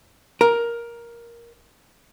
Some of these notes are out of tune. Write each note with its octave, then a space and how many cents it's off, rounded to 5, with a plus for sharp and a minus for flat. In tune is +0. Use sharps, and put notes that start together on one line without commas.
A#4 +10